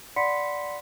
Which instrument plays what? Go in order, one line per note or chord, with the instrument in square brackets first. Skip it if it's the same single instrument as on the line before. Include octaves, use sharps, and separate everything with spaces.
[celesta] D5 F#5 B5 C6 B6 C#7